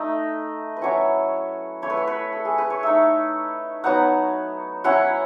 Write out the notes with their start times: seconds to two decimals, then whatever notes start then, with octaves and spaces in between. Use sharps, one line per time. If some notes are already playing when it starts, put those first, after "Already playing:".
Already playing: A3 D#4 D#5
0.76 B4
0.82 F#3 C#4 E4 C#5
1.82 A3 E4 C#5
1.90 B4
1.97 C#5
2.07 B4
2.32 A4
2.45 G#4
2.58 B4
2.70 C#5
2.83 A3 D#4 E5
3.84 F#3 B3 D#4 F#5
4.84 F#3 C#4 E4 F#5